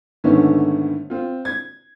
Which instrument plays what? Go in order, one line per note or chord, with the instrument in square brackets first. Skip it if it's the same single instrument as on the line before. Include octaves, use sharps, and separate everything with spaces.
[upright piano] G#2 D3 D#3 A3 B3 C#4
C4 F4
G#6